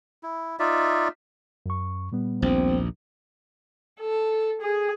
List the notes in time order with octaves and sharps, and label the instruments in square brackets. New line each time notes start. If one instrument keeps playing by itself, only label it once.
[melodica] E4
D#4 F4 D5 E5
[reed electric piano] F#2 C#6
A#2 G3 B3
[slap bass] A#1 D#2 [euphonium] C4
[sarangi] A4
G#4